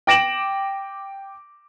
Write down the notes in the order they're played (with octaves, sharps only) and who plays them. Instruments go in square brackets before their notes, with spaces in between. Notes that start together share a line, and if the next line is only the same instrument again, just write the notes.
[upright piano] G5 D6 A#6 D7 E7 F#7